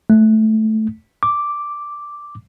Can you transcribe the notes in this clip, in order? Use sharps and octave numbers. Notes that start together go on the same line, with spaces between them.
A3
D6